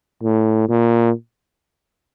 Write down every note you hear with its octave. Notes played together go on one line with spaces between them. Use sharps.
A2
A#2